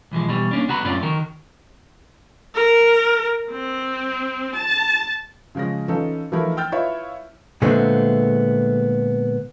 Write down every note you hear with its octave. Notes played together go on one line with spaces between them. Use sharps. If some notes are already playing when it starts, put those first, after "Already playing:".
B1 E3 F3 G#3
B2 E3 G3
A#3 C#4 D4
C2 B3 F#4 F#5 A#5 B5
F#2 A2 C4 C#4 F4 D5
D#3 F#4 A#4
A#4
C4
A5
C#3 F3 G#3 C#4 A#6
E3 C#4 D#4 F4 A4
E3 F3 A3 D#4 E4 A#4
G5 E6 F6 G6 A6
E4 F4 B4 C#5 E5 F5
A#2 D3 G#3 A3 B3 C4